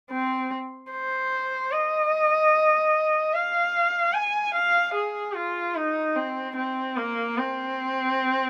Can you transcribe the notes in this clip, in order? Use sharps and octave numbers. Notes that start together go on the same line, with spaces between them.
C4
C5
D#5
F5
G#5
F5
G#4
F4
D#4
C4
C4
A#3
C4